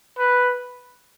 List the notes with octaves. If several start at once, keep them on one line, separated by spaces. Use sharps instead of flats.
B4